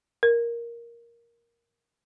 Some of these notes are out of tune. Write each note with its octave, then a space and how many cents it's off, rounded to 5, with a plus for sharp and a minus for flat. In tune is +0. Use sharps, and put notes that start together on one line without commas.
A#4 +5